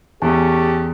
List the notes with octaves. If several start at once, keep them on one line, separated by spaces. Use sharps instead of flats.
E2 A3 C#4 G4 G#4 G#5